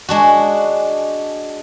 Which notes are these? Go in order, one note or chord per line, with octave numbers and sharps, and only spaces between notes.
G#3 D4 F#4